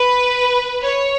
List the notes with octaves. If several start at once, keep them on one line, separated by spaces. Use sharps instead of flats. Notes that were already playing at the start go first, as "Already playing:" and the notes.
Already playing: B4
C#5